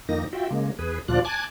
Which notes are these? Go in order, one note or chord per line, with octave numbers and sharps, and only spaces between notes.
F2 D#3 A#3 D#4 A#6
F4 F#4 E5 G5
C#3 G#3 A#3
E2 G#4 B4
D2 A#2 F3 F4 D5 F#6
G#5 A5 D6 F#6 G#6